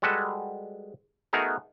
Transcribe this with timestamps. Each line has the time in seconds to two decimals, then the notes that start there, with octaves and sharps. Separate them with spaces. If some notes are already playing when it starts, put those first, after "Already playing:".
0.02 G3 G#3 F#4 A4 B4
1.33 A3 B3 D#4 F#4 G#4 A#4